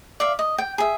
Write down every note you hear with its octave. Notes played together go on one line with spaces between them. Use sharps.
D5 E5 F5
D#5
G5
G#4 E5